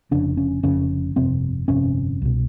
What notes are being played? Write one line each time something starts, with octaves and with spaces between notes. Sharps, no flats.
F1 F2 C#3 D4
C#4
F1 F2 C#3 C#4
G1 F2 C3 C4
G1 F2 C3 C#4
C2 B2